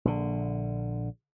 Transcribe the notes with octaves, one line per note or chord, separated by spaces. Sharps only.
A#1 D3